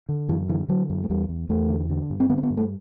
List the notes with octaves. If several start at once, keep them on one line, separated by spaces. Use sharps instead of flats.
D3
F#2 E3
D3 E3
D3 F#3
F#2
A3
E2 G3
E2
E2 A3
D3
D3
G2
C4
D3 B3
C4
B3
G2
A3